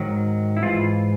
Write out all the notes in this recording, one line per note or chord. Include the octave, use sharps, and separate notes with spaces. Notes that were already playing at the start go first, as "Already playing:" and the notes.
Already playing: G#2 D#3 F#3
E4
G#2 E3 F4